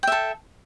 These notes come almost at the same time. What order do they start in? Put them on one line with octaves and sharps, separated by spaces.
G5 E5 A4